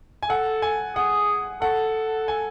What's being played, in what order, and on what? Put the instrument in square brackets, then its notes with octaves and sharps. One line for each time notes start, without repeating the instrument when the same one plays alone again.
[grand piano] G#5
[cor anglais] A4 [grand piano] F#5
[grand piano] G#5
[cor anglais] G#4 [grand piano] F#5
[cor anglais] A4 [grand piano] F#5
[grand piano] G#5